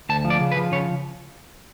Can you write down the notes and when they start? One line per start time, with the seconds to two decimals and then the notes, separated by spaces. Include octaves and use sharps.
0.09 D2 A5
0.25 F3
0.30 D5
0.41 C#3
0.52 B4
0.57 F3
0.72 C#3 C#5